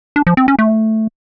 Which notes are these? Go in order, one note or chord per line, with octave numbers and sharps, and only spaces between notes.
D4
F3
C4
C#4
A3